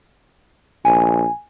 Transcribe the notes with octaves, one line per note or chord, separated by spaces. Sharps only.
A#1 G#5